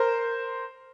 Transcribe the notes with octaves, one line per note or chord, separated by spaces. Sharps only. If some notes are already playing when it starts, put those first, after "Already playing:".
Already playing: A#4 C5